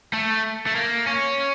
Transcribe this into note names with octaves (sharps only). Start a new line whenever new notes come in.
A3
A3
A#3
C#4